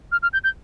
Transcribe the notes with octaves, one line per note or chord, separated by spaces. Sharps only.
F6
F6
G6
G6